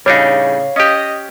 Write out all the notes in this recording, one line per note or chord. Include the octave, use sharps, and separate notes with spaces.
A2 C#3 G3 D4 D#4 C#5 F5
C#4 G4 D#5